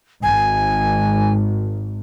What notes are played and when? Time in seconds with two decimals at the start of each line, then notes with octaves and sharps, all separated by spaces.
0.22 G#1 G#5